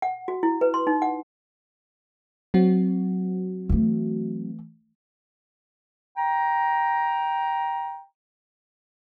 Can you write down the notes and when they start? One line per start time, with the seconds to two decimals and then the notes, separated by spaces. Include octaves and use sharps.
0.02 F#5
0.28 F#4
0.43 E4
0.61 B4
0.74 C6
0.87 D#4
1.02 F#5
2.54 F#3 C4 F#4
3.69 E3 A3
6.17 G5 A#5